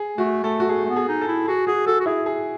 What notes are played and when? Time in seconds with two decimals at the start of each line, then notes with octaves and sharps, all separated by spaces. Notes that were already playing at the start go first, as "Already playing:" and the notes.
Already playing: G#4
0.18 A3 F#4
0.44 A3 A4
0.60 F#4
0.69 A3 G#4
0.84 A3
0.89 B3
0.96 G#4
1.09 D#4
1.21 A4
1.28 E4
1.48 F#4 G#4
1.67 F#4 G#4
1.87 F#4 A4
2.00 F#4
2.06 E4 G#4
2.26 G#4